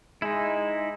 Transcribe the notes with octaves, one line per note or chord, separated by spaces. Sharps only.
G#3 D#4 E4